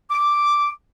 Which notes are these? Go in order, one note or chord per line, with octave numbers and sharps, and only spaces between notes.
D6